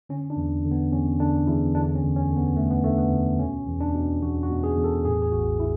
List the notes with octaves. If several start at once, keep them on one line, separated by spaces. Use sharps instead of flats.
D3 C#4
D4
E2
D3
B3
E2 C#4
D3 D4
E2 E4
D3 D4
C#4
D2
C#4
D3
B3
D2 A3
B3
D3 A3
B3
D2
B2 C#4
E2
D4
B2
E2 F#4
F#4
B2
G#4
E2
A4
A2 G#4
G#4
A1 F#4
E4